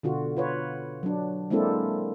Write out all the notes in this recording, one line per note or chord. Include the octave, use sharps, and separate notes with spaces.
B2 D3 F4 F#4
F4 B4 C#5
F#3 D4
G#3 A#3 C4 D4 E4 A4